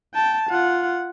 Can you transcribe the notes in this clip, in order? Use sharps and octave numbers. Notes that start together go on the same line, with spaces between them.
G5 A5
F4 F#5